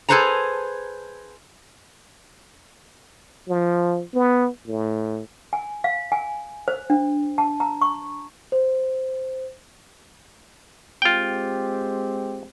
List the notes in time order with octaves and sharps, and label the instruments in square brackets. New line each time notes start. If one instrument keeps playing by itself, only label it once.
[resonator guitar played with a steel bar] G#4 A4 B4 C5 A5 A#5
[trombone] F3
B3
A2
[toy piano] G#5
F5
G#5
C5
D4
A5
A#5
C#6
[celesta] C5
[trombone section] G#3 C4 G4 [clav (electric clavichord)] F4 G5